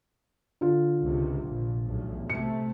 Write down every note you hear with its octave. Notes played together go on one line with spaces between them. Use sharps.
D3 F4
C#2 C3
A#1
B1 E2 A2
C3 A3 C#7